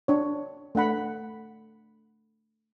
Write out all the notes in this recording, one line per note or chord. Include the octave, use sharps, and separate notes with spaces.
D4 C#5
A3 D4 F#5 B5